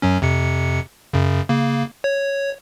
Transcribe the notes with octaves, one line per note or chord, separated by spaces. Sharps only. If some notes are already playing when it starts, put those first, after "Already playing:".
F#2 F#3 C#4
F2 C3 C#7
F#2 C#3
C#3 A#3
C#5